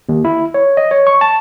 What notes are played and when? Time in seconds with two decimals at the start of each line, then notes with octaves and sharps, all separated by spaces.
0.09 D#2
0.25 E4
0.54 C#5
0.77 D#5
0.91 C#5
1.07 C#6
1.21 A5